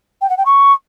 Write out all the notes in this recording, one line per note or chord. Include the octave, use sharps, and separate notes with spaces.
G5
F#5
G5
C#6